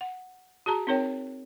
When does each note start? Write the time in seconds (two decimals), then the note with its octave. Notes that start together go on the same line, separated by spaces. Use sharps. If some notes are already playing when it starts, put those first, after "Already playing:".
0.01 F#5
0.66 F#4 G#4 A5 A#5
0.87 C4 D#4 A#4 C#5 G5